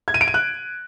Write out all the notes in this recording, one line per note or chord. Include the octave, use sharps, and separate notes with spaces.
G#6
D#7
D7
D#7
F#6